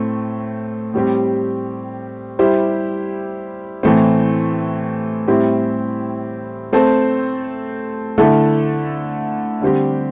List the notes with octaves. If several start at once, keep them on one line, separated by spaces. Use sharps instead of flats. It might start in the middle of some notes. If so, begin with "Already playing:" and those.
Already playing: A2 A3 C4
A2 G3 C4 G4
G3 E4 G4 C5
A2 E3 A3 C4
A2 G3 C4 E4 G4
A3 C4 A4 C5
D3 A3 E4 A4
D3 G3 C4 G4